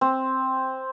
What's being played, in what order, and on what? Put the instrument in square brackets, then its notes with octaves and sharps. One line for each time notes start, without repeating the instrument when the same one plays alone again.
[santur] C4